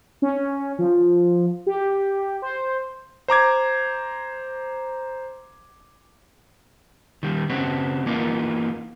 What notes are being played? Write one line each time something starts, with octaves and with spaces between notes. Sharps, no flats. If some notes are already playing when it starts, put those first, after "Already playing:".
C#4
F3
G4
C5
C5 A#5 D6 G#6
D#3 G3
C#3 B3 C4 F#4
E3 A#3 B3 D#4 F4